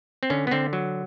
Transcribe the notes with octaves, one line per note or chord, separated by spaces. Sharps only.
C4
D3 C#4
B3
D3 C4
F#3